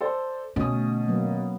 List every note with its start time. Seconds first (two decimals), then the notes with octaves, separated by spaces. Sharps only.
0.01 A4 C5 D5
0.56 B2 D3 A3 C#4 D#6
1.08 F#3 A#3 B3